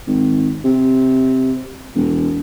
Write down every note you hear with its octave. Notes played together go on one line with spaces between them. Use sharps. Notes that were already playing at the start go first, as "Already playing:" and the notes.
G#1
C3
E1